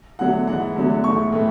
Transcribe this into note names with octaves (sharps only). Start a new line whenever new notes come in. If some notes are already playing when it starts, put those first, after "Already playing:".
E2 D3 F#3 A3 F#5
G#2 E3 A3 F#5
E2 D3 F#3 A3
G#2 E3 A3 C#6
A2 E3 A3